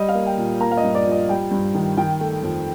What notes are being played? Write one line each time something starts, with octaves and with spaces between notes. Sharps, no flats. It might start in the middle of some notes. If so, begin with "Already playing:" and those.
Already playing: G3 D#5
F5
A#3
G5
A#2
A#3 A#5
F5
D#5
G2
D5
F3
D#5
G3 G5
G2
D#3
D#3 G5
A3
F2